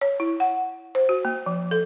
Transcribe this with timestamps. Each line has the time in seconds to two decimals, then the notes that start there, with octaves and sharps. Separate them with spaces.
0.01 C#5
0.20 E4
0.40 F#5
0.95 C5
1.09 F#4
1.25 A#3
1.46 F3
1.71 A4